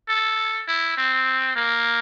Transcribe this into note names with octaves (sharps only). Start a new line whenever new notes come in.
A4
E4
C4
A#3